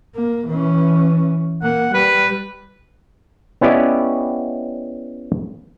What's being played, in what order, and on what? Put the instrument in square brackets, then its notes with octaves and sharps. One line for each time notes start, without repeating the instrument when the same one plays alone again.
[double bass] A#3
E3 C#4
[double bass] A#3 [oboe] F#5
[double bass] G3 [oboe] B4
[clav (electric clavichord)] B3 C#4 E4 G4 D5 D#5